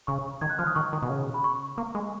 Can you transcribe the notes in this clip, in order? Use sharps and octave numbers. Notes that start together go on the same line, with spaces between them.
C#3 C#6
D#3 G#6
F#6
F3 F6
D#6
D#3 C#6
D#3
B2
C#3
B5
C#6
A#3
G#3